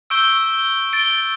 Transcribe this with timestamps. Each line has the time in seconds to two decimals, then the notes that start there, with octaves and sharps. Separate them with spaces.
0.10 C#6 E6 G6 D7 G7
0.93 A6 D7 G7